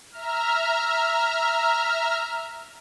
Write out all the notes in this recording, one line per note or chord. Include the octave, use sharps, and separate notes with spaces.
E5 A#5 F6